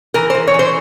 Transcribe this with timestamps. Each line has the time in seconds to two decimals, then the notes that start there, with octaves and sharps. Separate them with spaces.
0.14 E3 A#4
0.30 E3 C5
0.47 C#5
0.54 E3
0.59 C5